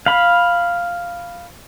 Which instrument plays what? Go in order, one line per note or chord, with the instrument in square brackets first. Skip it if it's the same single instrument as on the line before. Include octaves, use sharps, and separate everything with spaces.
[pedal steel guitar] F5 B5